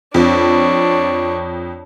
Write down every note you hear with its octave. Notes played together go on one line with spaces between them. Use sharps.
F2 D4 C#5